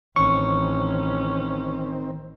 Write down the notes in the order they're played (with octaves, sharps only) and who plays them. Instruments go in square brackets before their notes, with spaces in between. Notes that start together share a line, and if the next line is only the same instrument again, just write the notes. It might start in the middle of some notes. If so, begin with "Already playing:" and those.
[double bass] A1 [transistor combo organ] D#3 C4 [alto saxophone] C#4 [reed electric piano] C#6